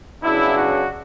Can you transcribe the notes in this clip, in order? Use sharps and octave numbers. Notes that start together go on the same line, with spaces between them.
C#3 F#3 B3 D4 E4
F#4